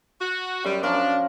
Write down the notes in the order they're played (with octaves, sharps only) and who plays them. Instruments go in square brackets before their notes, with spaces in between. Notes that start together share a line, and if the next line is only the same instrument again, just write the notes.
[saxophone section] F#4
[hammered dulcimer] F#2 [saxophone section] G3
[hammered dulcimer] F3 C#4 A#4 [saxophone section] D4